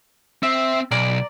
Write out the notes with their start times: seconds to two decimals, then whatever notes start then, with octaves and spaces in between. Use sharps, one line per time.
0.43 C4 E5
0.91 B1 D5 A#5